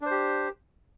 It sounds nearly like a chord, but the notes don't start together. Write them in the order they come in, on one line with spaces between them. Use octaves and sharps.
D4 C5 G4